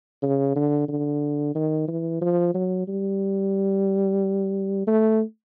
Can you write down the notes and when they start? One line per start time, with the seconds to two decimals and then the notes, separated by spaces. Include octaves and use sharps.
0.23 C#3
0.56 D3
0.88 D3
1.55 D#3
1.88 E3
2.22 F3
2.54 F#3
2.88 G3
4.87 A3